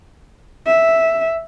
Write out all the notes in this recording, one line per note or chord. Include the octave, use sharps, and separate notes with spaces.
E5